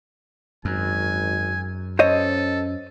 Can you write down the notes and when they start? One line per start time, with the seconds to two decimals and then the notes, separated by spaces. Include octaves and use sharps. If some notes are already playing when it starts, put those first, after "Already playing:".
0.65 G#1 F#2 G#5
1.99 C#4 A4 C5 C#5 D#5